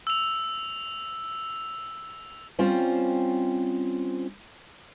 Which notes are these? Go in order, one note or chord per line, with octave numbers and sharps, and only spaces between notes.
E6 F7
G3 C4 C#4 F4 C5